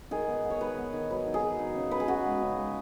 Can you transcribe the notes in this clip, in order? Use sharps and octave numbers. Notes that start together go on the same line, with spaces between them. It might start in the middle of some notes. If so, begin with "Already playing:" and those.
D#3 G#4
B3
B3
C#5
D#3 B4
B3
D#3
F#3 B4
D#4
G#4
F#3
D#4
C#3
D#4 B4
G#4
C#3 F#4
G#3
C#3
G#3